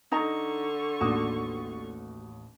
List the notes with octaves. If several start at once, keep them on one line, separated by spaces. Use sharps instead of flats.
D3 D#4 D#5 A#5 C#6
A1 D#2 D4 F#4 D#6